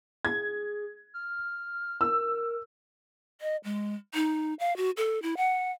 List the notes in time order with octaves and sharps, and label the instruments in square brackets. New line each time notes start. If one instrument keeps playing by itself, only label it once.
[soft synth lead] G#4 [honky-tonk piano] G#6
[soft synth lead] F6
[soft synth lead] A#4 [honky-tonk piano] E6
[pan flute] D#5
G#3
D#4
F5
F#4
A4
E4
F#5